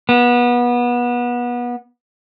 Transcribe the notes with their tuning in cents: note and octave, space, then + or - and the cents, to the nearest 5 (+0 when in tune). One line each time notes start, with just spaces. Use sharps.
B3 -25